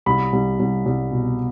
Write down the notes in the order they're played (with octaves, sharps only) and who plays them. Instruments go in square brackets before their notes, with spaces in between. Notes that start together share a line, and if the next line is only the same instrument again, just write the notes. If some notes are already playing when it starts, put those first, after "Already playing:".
[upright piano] C2 B5
C2
C2
C2
B2